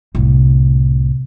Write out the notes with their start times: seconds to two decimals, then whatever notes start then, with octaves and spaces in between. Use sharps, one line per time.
0.15 C2 A2